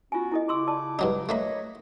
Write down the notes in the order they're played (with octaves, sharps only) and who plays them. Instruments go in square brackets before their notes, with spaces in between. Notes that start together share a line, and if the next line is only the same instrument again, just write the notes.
[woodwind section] B3 C#4 F#4 [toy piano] F4 G#5
[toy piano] E4 A4 D#5
[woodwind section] C#3 E4 D6 [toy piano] G4 C6 E6
[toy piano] D5 A5 E6
[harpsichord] G2 F#3 D#4
[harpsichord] A3 A#3 B5 [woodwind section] C#5 D#5